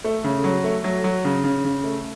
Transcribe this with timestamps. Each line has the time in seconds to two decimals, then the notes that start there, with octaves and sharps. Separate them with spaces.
0.04 A3
0.24 C#3
0.44 F#3
0.64 A3
0.84 F#3
1.04 F#3
1.25 C#3
1.44 C#3
1.65 C#3
1.84 A3